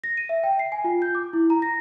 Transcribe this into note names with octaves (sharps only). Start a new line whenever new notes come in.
A#6
D#7
E5
G5
C7
G#5
F4
G6
D6
E4
A#5
A#6